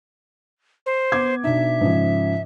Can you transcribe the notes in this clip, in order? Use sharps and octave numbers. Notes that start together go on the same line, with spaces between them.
C5
B3 D6 G#6
B2 D4 D#4 E5
G#2 C#3 F3